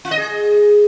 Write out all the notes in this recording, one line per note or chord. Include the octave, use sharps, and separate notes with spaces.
F4
D#5
G#4